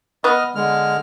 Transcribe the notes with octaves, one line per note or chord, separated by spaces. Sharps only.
B3 B4 D#5 F#5 F6
D3 G#3 F6